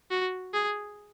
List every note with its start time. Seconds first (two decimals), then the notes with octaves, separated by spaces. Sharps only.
0.11 F#4
0.54 G#4